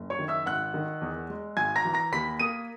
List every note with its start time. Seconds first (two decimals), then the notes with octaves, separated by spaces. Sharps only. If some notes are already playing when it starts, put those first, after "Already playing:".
Already playing: F#1
0.10 C#5 C#6
0.19 D#3
0.28 E5 E6
0.46 G#1 F#5 F#6
0.74 D#3
1.01 E2
1.30 G#3
1.57 G#1 G#5 G#6
1.76 A#5 A#6
1.85 E3
1.94 A#5 A#6
2.12 D#2 B5 B6
2.39 A#3 D#6 D#7